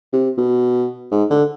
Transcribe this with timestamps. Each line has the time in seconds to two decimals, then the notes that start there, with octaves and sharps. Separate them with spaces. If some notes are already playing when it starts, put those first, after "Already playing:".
0.13 C3
0.38 B2
1.11 G#2
1.30 D3